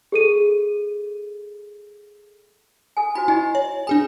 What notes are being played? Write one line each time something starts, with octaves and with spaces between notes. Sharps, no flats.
G#4 A4 D#7
A4 G#5
F4 F#4 C5 G#5
E4 C5 D#5 G#5
C#5
D4 G#4 A4 G#5